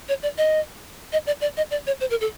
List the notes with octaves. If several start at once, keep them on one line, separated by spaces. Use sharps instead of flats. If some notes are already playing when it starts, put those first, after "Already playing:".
C#5
D5
D#5
D#5
D5
D5
D#5
D5
C#5
C5
A#4
A4